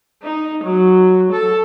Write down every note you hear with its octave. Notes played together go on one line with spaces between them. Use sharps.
D#4
F#3
A4